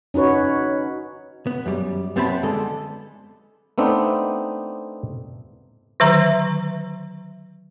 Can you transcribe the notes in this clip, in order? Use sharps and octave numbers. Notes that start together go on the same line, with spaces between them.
C#4 D#4 F#4 B4 C#5
B3
F#2 G3
F#2 B3 C4 A5 B5
D3 G#3 A4
A3 B3 C4 D4 D#4
D3 D#3 F#3 B4 E5 A#5